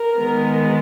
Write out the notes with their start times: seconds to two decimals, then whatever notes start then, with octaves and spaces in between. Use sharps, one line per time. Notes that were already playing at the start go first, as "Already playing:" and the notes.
Already playing: A#4
0.17 D#3 G#3 B3